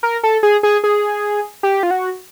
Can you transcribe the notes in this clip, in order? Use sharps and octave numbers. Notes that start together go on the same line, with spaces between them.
A#4
A4
G#4
G#4
G#4
G4
F4
F#4